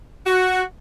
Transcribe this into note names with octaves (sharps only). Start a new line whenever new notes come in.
F#4